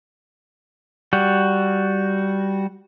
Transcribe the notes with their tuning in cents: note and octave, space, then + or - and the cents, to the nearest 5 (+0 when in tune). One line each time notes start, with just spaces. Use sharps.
G3 -5 F#4 +0